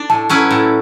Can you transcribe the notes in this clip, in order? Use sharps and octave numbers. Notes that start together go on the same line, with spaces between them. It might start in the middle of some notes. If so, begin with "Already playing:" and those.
Already playing: D4 D5
A2 A5
F#3 C#4 E4 B4
A2